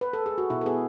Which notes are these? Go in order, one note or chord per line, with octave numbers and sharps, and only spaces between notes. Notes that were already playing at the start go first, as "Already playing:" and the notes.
B4
A4
G#4
F#4
B2 E4
A4
B3 G#4